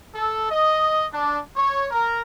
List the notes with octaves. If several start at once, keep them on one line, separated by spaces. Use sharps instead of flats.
A4
D#5
D4
C#5
A#4